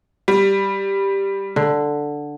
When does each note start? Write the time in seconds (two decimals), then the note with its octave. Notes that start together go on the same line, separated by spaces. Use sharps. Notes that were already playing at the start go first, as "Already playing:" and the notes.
0.28 G3
1.56 D3